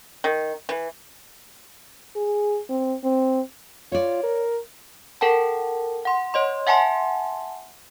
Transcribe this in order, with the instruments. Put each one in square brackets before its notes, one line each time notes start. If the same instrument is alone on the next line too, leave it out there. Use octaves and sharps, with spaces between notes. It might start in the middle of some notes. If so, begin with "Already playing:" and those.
[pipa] D#3
E3
[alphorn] G#4
C4
C4
[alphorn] F4 [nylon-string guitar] C#5 D5
[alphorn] A#4
[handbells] A4 A#4 F#5 G5 A5
F#5 C6
C#5 D#5 C6
E5 F#5 G#5 A5 C6